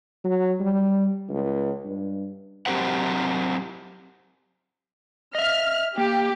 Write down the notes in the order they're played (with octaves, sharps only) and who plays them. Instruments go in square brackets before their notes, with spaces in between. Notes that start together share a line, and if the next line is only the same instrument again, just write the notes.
[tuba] F#3
G3
C#2
G2
[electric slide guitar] F#3 C4 G4 A#4 C5 F#5
[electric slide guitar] D#5 E5 [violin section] F6
[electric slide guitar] A#3 [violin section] G4